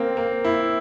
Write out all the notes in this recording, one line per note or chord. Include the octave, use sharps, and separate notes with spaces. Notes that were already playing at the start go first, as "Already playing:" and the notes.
Already playing: A#3 C4
A#3
E4